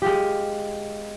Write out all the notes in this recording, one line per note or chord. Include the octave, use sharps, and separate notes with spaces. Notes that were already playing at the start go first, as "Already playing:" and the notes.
G#3 F4 G4